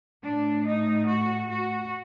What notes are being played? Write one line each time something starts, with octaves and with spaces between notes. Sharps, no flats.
A2 D4
D#4
F#4
F#4